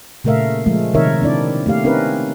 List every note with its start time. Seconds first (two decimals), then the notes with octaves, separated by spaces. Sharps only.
0.24 A#2 C#3 A3 A#4 E5 F5
0.66 F3 G#3 A3
0.94 C3 D#3 D#4 A#4 C#5 E5
1.22 C4 D4 E4 D5
1.66 A3 A#3 G4 F5
1.84 C4 C#4 D#4 A#4 B4